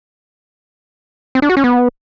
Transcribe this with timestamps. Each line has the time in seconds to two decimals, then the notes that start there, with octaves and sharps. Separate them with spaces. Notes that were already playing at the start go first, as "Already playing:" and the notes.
1.35 C4
1.42 D4
1.49 F#4
1.57 C#4
1.64 B3